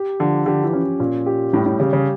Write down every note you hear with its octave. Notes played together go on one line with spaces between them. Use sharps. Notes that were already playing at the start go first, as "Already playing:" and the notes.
Already playing: G4
D3 F3
D3 G4
E3
C#4
A#2 C#4
G4
A2 G3
A2
C#3 G4
C#3